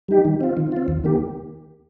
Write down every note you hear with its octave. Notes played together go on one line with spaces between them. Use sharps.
G3 D#4 G4
D#3
C4 F4
D#3
C4 F4
D#2
D#3 A#3 G4